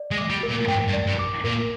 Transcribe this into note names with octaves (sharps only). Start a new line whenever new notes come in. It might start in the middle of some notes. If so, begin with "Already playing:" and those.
Already playing: D5
G#3
D6
G3
A#4
A#2
G#2 G5
G2
D5
G2
D6
A#2 A#4